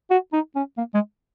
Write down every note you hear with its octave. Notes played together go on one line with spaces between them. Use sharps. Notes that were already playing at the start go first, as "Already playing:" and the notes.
F#4
D#4
C#4
A#3
G#3